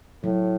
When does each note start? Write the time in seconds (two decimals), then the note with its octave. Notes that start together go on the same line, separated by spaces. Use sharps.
0.24 A2 F#3